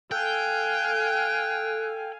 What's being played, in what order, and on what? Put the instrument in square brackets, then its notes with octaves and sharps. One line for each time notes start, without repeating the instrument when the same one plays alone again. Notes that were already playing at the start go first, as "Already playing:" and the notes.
[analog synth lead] A4 [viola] F5 G#5 [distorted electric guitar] G5 [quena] F#6